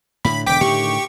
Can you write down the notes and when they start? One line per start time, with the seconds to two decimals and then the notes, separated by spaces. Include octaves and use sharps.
0.25 A2 D3 B5
0.46 E1 D3 G5 D6 B6
0.61 A2 D3 D#3 G4 C#6